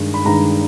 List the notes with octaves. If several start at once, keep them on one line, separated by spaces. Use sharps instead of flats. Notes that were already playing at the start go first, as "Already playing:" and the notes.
Already playing: G2 D#3 G#3
B5
G2 D#3 G#3 A#5